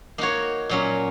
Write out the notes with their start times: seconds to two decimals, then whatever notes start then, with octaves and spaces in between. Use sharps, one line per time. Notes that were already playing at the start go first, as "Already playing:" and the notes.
0.18 A#3 D#4 F#4 C#5
0.70 A#2 F#3 C#4